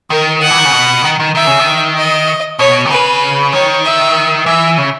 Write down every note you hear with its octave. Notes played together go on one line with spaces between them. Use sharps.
D#3 A#4
F#5
E3
D#3
C#3
B2
D#3
D#3
D#3 E5
C#3
D#3
D#5
B2 C#5
D#3
C#3 B4
D#3 C#5
E5
E3 E5
C#3